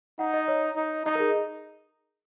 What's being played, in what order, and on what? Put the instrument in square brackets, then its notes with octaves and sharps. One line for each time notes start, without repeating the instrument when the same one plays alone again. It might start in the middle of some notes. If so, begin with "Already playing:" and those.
[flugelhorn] D#4 [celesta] F#5
[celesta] D#5
C#5
[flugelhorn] D#4
[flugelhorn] D#4 [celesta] D#5
[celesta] A#4
G#4